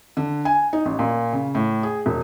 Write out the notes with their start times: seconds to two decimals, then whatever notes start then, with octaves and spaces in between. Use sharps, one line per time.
0.17 D3
0.45 G#5
0.73 D#4
0.86 A1
0.99 A#2
1.33 C#3
1.55 A2
1.83 G#4
2.06 E1